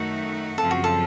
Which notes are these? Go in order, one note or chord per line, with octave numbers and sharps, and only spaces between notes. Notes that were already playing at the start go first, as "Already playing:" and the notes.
Already playing: F#2 D#3 A3 D#4 F#4
F#2 C#3 F3 C4 F4 A4
F#4
A4